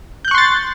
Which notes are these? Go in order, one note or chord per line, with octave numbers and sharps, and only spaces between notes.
C6 C#6 F#6 G6 A6